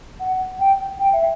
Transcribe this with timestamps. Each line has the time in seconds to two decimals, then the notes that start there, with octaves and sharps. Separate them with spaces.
0.20 F#5
0.59 G5
0.99 G5
1.12 E5